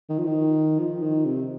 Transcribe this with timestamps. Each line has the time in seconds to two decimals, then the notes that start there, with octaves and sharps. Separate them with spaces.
0.09 D#3
0.18 F3
0.27 D#3
0.79 F3
1.02 D#3
1.25 C3